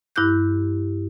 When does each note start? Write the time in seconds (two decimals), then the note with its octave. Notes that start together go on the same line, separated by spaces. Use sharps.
0.16 G2 E4 G4 D6 F#6 G6